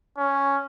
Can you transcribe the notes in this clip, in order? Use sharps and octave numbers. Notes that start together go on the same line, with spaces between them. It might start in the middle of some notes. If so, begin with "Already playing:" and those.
C#4